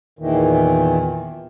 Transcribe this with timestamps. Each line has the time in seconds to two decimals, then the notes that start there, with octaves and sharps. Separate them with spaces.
0.19 E2 A#2 D#3 E3